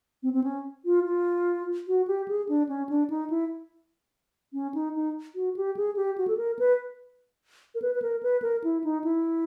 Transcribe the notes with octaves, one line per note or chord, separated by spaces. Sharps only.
C4
C4
C#4
F4
F4
F#4
G4
G#4
D4
C#4
D4
D#4
E4
C#4
D#4
D#4
F#4
G4
G#4
G4
F#4
A4
A#4
B4
A#4
B4
B4
A#4
B4
A#4
E4
D#4
E4